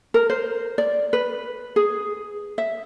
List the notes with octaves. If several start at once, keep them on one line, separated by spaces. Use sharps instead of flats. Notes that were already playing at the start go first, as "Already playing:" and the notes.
A#4
C5
D5
B4
G#4
E5